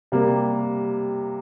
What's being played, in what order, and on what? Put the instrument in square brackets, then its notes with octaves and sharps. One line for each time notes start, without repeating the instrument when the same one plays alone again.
[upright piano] C3 G3 A#3